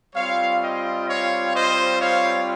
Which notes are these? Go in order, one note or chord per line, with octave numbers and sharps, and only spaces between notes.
G3 C4 F4 C#5 F5
D#5 G5
C#5 F5
C5 D#5
C#5 F5